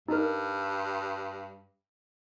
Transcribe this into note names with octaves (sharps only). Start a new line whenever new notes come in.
G2 D#4 A#4